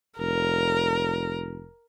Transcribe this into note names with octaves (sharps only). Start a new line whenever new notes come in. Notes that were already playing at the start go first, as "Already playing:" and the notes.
F1 A#4